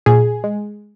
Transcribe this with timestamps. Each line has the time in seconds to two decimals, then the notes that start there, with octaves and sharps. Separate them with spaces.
0.06 A#2 G#4
0.44 G#3